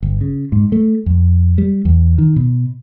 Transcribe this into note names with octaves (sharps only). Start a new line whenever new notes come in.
G1
C#3
G#2
A3
F2
G3
E2
D#3
B2